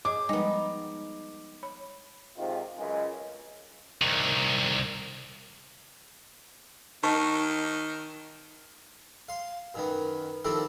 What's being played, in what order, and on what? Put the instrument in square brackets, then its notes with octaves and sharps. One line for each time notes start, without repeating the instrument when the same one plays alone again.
[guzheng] G#4 [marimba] C#5 D#5 [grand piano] D6
[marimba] F3 G3 G#3 [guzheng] B3 D#4
[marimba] C#5 B5
[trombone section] G#2 C3 D#3 F4
C#2 F#2 G#3
[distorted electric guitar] C2 D#3
[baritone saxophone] D#3 [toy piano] D#5 A5 C#6
[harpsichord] F5 C6
F#2 D#3 B3
D#3 F3 C4 E4 G4 A4